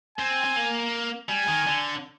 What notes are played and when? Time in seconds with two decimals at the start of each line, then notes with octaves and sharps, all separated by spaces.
0.18 C4 G#5
0.44 C4
0.56 A#3
1.29 G3 G#5
1.48 D#3
1.67 D3